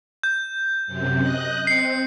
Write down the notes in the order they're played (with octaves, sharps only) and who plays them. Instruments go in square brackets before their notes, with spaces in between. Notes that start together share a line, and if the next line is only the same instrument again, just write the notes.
[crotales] G6
[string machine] F#2 C3
D#5 F#6
[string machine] C4 [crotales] C7 C#7